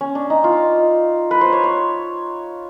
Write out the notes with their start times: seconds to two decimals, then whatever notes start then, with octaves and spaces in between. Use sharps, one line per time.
0.01 C#4
0.15 D4
0.30 D#4
0.44 F4
1.31 B4
1.41 C5
1.52 C#5
1.63 C#5